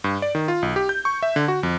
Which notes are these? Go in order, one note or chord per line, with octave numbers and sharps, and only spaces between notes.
G2
D5
D#3
F4
B1
G4
G6
C#6
E5
D3
F#4
F2